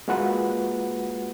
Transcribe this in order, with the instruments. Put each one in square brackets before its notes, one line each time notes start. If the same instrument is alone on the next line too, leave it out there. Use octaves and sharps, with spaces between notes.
[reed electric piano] G#3 A#3 F4 F#4 B4 F#5